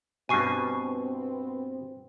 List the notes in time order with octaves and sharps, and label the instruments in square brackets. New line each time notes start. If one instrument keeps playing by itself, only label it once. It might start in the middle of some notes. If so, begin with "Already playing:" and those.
[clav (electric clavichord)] G2 B2 [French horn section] B3 C4 [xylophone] G#5 C#6 C7